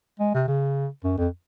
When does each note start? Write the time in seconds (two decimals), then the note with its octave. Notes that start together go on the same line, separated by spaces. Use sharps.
0.20 G#3
0.34 C3
0.48 C#3
1.04 F#2
1.18 F2